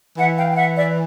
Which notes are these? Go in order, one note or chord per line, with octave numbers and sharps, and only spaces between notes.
E3 E5 F#5
F5 G5
G5
E5 F#5
D5 E5